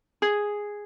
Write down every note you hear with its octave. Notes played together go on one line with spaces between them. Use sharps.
G#4